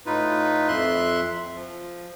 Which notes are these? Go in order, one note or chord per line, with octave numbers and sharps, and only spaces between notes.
A2 D#4 F4 B4
F2 E5 C6 F#6
F3